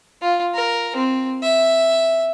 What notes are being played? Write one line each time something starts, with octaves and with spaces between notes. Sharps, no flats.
F4
A#4
C4
E5